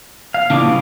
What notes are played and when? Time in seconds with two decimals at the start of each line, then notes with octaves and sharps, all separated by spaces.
0.34 F5
0.50 A#2 C#3 E3 D4 D6
0.66 G3